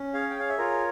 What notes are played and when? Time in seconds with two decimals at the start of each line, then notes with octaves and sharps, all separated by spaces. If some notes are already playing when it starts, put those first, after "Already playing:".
Already playing: C#4
0.14 G#4 C#5 F5
0.30 G5
0.40 F5
0.49 E5
0.58 F4 A#4 C#5